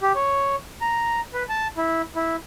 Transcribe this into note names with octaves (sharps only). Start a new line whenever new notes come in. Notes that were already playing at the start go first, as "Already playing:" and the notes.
G4
C#5
A#5
B4
A5
E4
E4